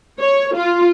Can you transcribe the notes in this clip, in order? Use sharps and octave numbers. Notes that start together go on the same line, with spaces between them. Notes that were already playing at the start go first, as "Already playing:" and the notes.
C#5
F4